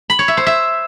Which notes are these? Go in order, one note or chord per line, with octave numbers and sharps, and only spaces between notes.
B5
C#5
E5
C5
E5